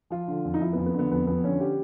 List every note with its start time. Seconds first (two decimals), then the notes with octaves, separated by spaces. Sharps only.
0.10 F3 F4
0.28 D3
0.45 F2
0.54 D#4
0.61 F3 E4
0.73 B3
0.77 F2
0.86 B3
0.94 D3
0.99 B3
1.11 F2 B3
1.27 F2 B3
1.44 D3 C#4
1.60 G4